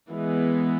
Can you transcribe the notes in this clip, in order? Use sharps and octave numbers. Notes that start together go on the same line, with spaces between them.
E3 G#3 B3